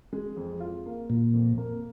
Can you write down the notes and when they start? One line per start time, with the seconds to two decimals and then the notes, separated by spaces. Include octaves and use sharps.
0.13 G#3
0.36 F2
0.60 F4
0.86 A#3
1.10 A#2 F4
1.34 F2
1.58 A#3